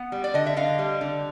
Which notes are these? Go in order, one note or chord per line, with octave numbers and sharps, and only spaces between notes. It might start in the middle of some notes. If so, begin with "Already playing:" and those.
Already playing: B3 F#5
G3
D5
D3 D#5
E5
D3 D#5 F5
G3
D3